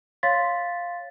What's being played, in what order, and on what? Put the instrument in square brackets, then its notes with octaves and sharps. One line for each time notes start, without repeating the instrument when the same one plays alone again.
[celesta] C#5 F5 C6 A6 B6